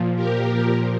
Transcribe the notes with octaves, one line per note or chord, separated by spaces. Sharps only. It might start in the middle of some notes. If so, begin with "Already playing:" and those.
Already playing: A#2 F3
G4 A#4